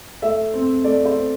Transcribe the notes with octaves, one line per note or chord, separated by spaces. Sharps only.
A3 E5
C4
A3 D5
C5
C4